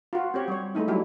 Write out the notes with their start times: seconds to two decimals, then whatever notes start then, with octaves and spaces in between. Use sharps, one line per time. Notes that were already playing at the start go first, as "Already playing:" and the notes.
0.13 F4 F#4
0.34 C4 G4 C#5
0.48 G3 C#5
0.75 G#3 A3 D#4 E4
0.88 F#3 G3 E4